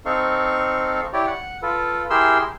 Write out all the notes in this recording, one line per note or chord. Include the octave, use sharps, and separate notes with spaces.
C4 D#4 A4 F5 C#6
E4 G4 C#5 D5
F#5
F4 A4 B4
E4 G4 G#4 A#4 C6 E6